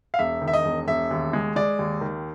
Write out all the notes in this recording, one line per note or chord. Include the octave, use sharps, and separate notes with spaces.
F5
E1 E5
D#3
E5
D#5
E1
E1 E5
D#2
G#3
G#3 D5
D#2
D#3